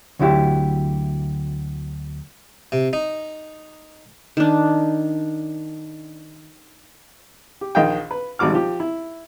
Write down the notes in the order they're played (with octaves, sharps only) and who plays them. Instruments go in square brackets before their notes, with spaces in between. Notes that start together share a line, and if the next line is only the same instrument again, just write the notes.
[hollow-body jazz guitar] D2 D3 F#3 E4 G4
[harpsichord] C3
D#4
[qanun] D#3 D4
[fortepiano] G4
A#1 D#3 D#5 F5 G5
B4
G#1 G3 F#4 D6 F6
F3 G4
E4